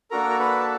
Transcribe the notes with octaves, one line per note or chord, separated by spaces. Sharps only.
A#3 D4 F#4 A4 A#4 A#5
A#5
B4 B5
A5